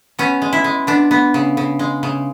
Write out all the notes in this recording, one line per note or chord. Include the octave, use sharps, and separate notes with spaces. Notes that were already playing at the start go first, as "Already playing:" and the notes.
B3 C#4
G#3
E4
G#3
B3 D4
B3
C#3
C#3
G#3
C#3